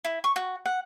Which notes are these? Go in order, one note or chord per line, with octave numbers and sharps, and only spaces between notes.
E4
C#6
F#4
F#5